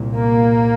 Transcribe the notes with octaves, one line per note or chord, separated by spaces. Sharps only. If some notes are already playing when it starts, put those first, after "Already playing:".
Already playing: C2 A#2
A#3